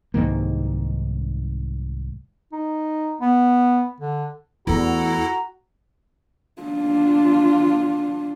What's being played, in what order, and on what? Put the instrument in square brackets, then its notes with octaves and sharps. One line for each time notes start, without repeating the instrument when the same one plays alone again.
[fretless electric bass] C2 G#2 D#3 A#3
[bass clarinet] D#4
B3
D3
[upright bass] E2 A3 [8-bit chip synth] E4 A4 [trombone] F#4 [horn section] A#5
[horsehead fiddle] D4 F4